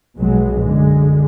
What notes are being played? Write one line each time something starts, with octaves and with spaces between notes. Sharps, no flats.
B1 B2 F#3 G#3
F#2 D3 G#3